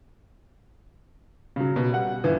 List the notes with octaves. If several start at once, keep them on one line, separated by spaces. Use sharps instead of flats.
C#3 F#3
B2
G3 F#5
G1 E3